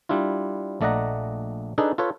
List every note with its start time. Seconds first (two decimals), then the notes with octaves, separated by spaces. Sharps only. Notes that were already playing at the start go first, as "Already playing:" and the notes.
0.09 G3 D4 E4 F4
0.81 A#1 A3 D5 D#5 F#5 A#5
1.78 D4 D#4 G#4 A4 B4
1.98 F4 A4 B4 C#5